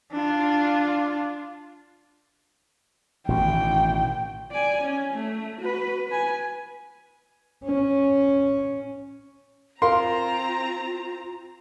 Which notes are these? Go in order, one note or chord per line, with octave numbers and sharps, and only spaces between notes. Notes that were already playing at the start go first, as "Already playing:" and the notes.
D4 F4
A1 B2 D#3 G5
D5 G#5
C#4
A3
F#4 B4
B4 G#5
C#4
C4 F4 A#4 F5 A#5 C6